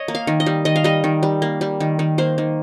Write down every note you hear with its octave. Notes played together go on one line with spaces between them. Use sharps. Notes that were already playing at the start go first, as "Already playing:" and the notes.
Already playing: C#5 D#5
A#3
F5
D#3
D#5
G3
D#3 D#5
F5
G3 D#5
D#3
G3
A#3
G3
D#3
D#3
A#3 C5
D#3